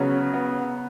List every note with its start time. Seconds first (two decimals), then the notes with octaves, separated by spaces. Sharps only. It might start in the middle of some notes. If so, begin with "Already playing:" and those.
Already playing: C#3 F#3 B3 C#4
0.34 B3